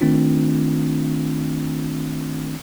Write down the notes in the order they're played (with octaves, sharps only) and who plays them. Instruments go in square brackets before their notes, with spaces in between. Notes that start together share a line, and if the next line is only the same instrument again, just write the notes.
[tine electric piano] D#3 A3 C4 D4 F4